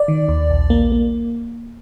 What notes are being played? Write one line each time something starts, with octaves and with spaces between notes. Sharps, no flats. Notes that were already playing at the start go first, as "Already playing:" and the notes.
Already playing: D5
D#3
D#2
A#1
A#3
A#3